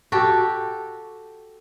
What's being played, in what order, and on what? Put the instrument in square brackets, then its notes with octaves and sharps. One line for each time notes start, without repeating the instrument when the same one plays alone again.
[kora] F#4 G4 A4